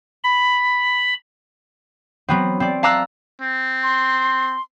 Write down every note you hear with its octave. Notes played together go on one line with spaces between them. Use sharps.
B5
F#3 B3 C4
C4 D5
F5 A5 A#5 D6 E6 F#6
C4
C6